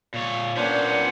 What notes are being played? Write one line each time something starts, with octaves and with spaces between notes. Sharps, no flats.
A#2 C#5
A#2 B3 C#4 D4 C5